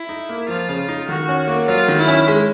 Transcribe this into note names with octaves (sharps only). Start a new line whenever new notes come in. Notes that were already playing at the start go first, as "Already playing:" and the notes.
Already playing: E4
D#4
A#3
F3 F4
C#3
D#4
D#3 F#4
C#4
A#3
F#3 F4
D#3
E4
C#4
G#3